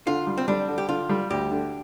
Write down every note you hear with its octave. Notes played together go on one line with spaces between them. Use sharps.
D3 F4
G3
C4
G3 D4
D3
G4
D3 F4
G3
D2 G4
D3